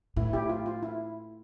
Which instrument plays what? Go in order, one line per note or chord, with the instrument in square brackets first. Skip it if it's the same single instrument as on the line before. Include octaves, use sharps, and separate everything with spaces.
[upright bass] A2 [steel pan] E4
[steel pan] E4 G4
F4
F4
E4